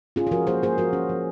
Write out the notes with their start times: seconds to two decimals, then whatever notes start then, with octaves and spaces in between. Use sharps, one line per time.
0.16 C#4 F4 G#4
0.27 G#4
0.31 F3 F#4 A#4
0.47 A#3 G#4 C5
0.62 A#3 G#4 C5
0.78 F3 F#4 A#4
0.93 C#4
1.09 F3